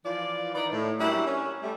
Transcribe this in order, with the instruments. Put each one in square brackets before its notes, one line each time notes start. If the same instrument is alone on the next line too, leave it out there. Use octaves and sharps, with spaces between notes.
[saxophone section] E3 F3 F4 D5
D#3 E3 D#4 B4 D5
A2
F#3 G3 A#3 C#4 D4 E4
C#4
G3 A3